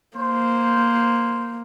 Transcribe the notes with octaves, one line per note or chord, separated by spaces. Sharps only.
A#3 C5